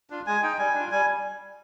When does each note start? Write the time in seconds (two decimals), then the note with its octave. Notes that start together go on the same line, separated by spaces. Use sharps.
0.10 D4 F4
0.27 G#3 G#5
0.43 D#4 G5
0.59 G3 G#5
0.75 D4 F4
0.91 G3 G#5